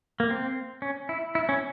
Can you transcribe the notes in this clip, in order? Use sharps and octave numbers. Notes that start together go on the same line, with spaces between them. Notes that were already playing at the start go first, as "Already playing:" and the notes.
A#3
C4
C#4
E4
E4
C#4